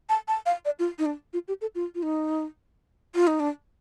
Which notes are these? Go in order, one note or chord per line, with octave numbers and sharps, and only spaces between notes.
A5
A5
F5
D5
F4
D#4
D4
F4
G4
A4
F4
F4
D#4
F4
D#4
D4